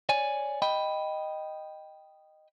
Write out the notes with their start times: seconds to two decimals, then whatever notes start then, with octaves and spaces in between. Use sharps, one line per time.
0.09 C#5 D5 G#5
0.62 D#5 G5 B5